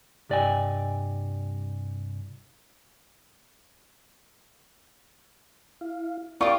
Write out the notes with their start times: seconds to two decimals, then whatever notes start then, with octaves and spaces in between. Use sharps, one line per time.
0.30 C2 G2 D5 D#5 G5 G#5
5.81 E4 F5
6.41 E4 F4 G4 A#4 D5 C#6 D#6